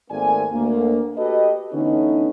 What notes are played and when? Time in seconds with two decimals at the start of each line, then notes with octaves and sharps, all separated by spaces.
0.11 G#1 A3 A#3 C4 D5 G#5
0.53 D2 A#3
1.18 F#4 G4 A4 B4 D#5
1.73 D3 E3 A3 B3 C#4 D#4